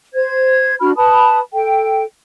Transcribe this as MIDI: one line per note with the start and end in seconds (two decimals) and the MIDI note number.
0.14 0.75 72
0.14 0.75 92
0.80 0.91 62
0.80 0.91 66
0.80 0.91 83
0.80 0.91 89
0.96 1.39 71
0.96 1.39 81
0.96 1.39 83
0.96 1.39 87
1.53 2.04 69
1.53 2.04 79